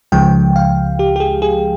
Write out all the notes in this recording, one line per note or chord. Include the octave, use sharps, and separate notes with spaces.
C#2 C#3 F3 G#3 G5
F5
G4
G4
G#4
G#4